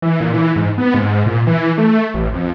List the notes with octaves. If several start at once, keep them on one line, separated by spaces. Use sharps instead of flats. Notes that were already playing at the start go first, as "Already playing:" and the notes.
E3
A#2
E3
G#2
B3
G#2
A#2
E3
A3
A1
F2